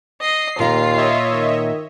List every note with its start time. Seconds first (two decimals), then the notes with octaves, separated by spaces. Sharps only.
0.21 D#5 C7
0.59 D#2 A#2 F4 A#5
0.97 C#5 D#5 E5
1.30 D#3